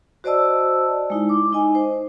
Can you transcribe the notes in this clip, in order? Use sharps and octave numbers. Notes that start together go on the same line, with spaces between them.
F#4 C5 D5 D#5 A5 E6
G#3 D#4 E4
D6
D#4 D#5 G#5
C5